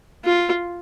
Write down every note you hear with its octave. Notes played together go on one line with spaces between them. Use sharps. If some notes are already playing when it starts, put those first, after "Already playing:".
F4